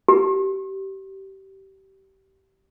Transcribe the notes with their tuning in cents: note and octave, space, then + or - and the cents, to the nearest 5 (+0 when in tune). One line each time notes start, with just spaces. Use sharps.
G4 -25